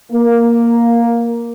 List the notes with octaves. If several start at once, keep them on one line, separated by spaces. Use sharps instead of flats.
A#3